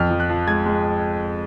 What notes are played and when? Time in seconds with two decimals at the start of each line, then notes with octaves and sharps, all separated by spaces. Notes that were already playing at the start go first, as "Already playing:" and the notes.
Already playing: F2 F6
0.10 F3
0.20 F#6
0.29 F3
0.47 G#3 G#6
0.66 G#3